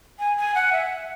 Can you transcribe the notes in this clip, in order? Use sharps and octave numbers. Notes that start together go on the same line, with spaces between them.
G#5
G#5
F#5
E5